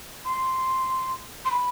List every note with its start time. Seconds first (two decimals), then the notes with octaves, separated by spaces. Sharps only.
0.25 C6
1.45 C6
1.51 B5